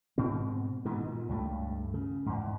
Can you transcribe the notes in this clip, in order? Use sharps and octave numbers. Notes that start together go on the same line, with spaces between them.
G#2 B2 C4
G#2 B2 D#3 E3
A#2
C#2 G2 F3 A3
C#3
E2 G#2